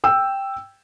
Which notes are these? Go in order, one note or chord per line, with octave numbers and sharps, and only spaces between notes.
G5 E6